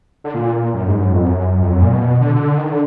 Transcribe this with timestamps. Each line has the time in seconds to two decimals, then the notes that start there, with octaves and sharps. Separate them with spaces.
0.24 D3
0.34 A#2
0.74 F#2
0.88 G#2
1.00 F#2
1.12 F2
1.24 F#2
1.62 F2
1.72 F#2
1.82 A#2
1.91 B2
2.21 D3
2.36 D3
2.58 D#3
2.69 D3